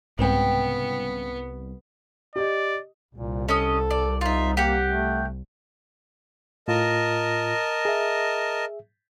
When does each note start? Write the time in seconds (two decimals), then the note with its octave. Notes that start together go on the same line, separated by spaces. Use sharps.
0.19 C2 G#2 C#3 B3 C4 G5
2.36 G4 D5 D#5
3.15 C2 A#2
3.49 C#4 A4 D#5
3.91 D5
4.21 D#4 F4 E5
4.57 A#3 G4 F#5
4.88 A3
6.68 A2 F4 A#4 D#5 A5
7.85 G#4 E5